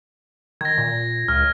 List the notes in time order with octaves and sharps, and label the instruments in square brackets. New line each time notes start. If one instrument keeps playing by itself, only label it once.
[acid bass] D#3 [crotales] G#6 A#6
[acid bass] A#2
[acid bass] C#2 [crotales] F6